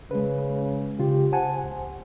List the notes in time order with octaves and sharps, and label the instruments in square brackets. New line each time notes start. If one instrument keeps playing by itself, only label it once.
[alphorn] C#3 [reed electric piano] G#3 B4
[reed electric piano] C#3 F4 [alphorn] G4
[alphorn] C5 [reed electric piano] F#5 G#5 A5
[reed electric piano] C#2